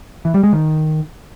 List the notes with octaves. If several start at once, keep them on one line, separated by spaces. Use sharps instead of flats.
E3
G3
G#3
D#3